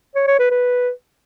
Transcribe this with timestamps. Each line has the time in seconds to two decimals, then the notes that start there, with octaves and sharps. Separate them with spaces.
0.15 C#5
0.27 C#5
0.39 B4
0.51 B4